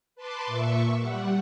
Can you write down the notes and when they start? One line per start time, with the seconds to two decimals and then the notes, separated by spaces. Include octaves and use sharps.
0.16 B4 A5 C6 D6
0.46 A#2 E5 C#6
1.00 G3 F#5